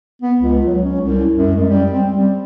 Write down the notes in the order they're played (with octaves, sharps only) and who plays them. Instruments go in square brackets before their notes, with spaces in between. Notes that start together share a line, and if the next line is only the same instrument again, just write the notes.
[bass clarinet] B3
C#2
F#3
C#4
C2
F#2
G#3
G3
C4
G3